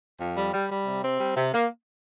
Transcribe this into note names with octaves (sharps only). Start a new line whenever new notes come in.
F2
G3
G3
G3
C3
C4
G3
C3
A#3